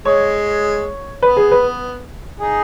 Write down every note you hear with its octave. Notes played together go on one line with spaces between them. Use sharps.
G#3 C#5
B3 B4
G#4
B4
D#4 G#4